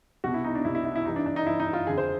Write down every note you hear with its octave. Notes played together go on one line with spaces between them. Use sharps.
C2 B2 F#4
E4
D#4
D4
C2 B2 E4
E4
E4
E4
G2 E3 D#4
D4
D4
D#4
G2 E3 E4
D#4
F4
F2 D3 F3 G#4
C5